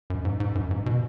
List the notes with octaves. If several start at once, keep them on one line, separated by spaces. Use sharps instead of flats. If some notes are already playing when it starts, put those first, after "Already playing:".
F#2
G#2
G#2
F#2
G#2
B2